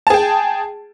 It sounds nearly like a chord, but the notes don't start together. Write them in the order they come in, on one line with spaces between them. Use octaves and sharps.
A5 G#4 G5